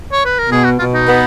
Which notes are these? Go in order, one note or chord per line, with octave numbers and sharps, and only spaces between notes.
C#5
B4
A#4
B2 G#4
F#4
B2 F4
D#4
B3